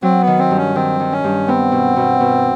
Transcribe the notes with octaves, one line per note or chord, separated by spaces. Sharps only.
F#3 C4
B3
D#3
C4
G2
C#4
D#3 C4
D#3
C#4
G2
B3 C4
B2
B2
B2